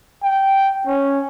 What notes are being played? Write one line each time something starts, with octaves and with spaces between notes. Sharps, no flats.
G5
C#4